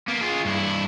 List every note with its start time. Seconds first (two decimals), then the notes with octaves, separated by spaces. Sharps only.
0.08 A#3 B3
0.21 F4 G#4
0.46 G2 E4